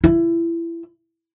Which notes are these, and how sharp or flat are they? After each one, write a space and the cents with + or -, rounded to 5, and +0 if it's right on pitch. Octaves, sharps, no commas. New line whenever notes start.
E4 +25